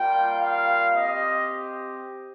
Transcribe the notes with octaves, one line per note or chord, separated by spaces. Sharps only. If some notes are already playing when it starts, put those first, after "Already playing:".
Already playing: G3 A#3 F4 G5
F5
C4 G4 D#5